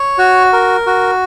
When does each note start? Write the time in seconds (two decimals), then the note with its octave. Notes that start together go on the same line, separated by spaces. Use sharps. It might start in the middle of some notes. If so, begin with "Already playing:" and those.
Already playing: C#5
0.18 F#4
0.53 A#4
0.87 F#4